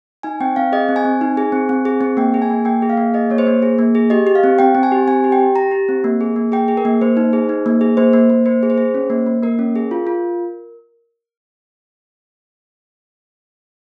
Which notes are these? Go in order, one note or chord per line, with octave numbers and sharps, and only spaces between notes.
D#4 G#5
C4 G5
C4 F5
G#4 D#5
C4
G#5
C4
D#4
G#4
C4
C4
G#4
C4
A#3 G5
G#4
G#5
A#3
A#3 G5
G#4
F5
A#3
G#4 D#5
A#3 C#5
C5
A#3
G#4
A#3
G#4
G4 D#5
G4
F5
C4
C4 G5
C4
G#5
G4
C4 G#5
G4
G5
G4
G4 A#5
G4
C4
A#3
G#4
A#3
G#4 G5
G#4
A#4
A#3
A#3 C5
D#4
G#4
D#4
A#3
G#4
A#3 C5
A#3
A#3
A#3 C5
G#4
C5
G#4
C#4
A#3
A#3
A#3 A#4
C#4
G#4
F4
F4